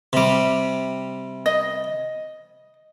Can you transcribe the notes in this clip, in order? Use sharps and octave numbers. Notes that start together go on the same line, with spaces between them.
C3 G3
D#5